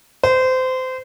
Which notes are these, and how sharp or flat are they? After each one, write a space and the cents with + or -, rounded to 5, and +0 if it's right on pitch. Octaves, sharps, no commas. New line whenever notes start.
C5 -25